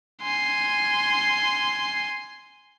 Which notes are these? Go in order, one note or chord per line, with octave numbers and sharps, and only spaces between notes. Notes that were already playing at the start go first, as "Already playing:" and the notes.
G#5 C6